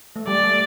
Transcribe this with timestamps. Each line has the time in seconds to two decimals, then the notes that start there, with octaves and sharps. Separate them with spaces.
0.16 A3
0.27 G3 D5
0.43 A3